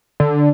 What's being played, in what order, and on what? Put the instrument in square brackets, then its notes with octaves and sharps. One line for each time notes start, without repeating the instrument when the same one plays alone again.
[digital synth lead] D3